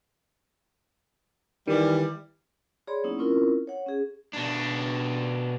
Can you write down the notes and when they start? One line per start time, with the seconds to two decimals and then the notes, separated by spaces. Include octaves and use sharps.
1.67 D#3 E3 G3
2.87 G#4 C#5 D5 B5 C6
3.04 F#3 A#3 B3 C#4 D#4 E4
3.18 C4 C#4 E4 F4 A#4
3.67 C#5 F#5
3.86 C#4 G#4
4.34 B2 D4